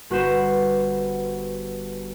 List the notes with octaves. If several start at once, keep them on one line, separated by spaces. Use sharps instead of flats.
G1 F#4 B4 C5 E7